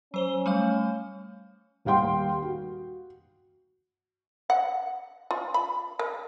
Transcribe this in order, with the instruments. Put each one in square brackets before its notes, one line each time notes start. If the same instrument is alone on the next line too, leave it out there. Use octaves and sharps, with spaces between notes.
[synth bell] F#3 C5 G7 [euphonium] C#4
[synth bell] G3 A3 F5
[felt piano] D#1 G3 F5 G5 C6
F#4
[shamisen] F#5
F4
B5
A#4